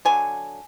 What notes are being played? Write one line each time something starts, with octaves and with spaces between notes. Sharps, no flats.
D3 F#3 G#5